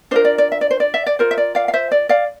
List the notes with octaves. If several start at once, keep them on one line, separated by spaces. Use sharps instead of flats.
D4 F4 A#4 C5
D5
D5
E5
D5
C5
D5
E5
D5
F4 A#4 C5
E5
D5
D5 F5
F5
C5 E5
D5
D5 F5